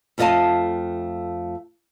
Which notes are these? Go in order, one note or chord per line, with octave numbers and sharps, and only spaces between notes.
F2 A3 F4 D#5 F5 A5